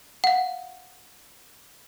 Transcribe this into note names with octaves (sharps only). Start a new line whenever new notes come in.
F5 F#5